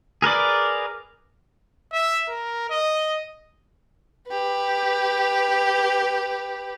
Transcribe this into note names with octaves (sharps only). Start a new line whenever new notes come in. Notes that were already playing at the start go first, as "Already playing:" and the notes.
G#4 A#4 B4 D5
E5
A#4
D#5
G4 B4